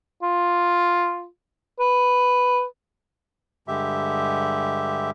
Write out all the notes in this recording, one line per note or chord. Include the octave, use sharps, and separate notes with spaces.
F4
B4
G2 D3 G#3 G4 E5